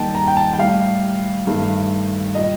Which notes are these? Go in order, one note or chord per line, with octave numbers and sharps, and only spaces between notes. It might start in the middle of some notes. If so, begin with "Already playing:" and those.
Already playing: D#2 D#3 G3 D#5 G5 A5
A#5
G5
A5
G5
A2 G3 F5
G2 D#3 A3
A#2 G3 D#5